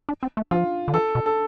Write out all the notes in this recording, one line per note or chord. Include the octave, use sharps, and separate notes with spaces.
D4
C4
A3
F3 F4
D3
E3 A4
B2
A4